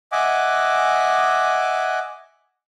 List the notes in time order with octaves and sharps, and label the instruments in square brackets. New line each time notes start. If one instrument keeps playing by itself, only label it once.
[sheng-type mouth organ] D#5 E5 F#5 G#5 D6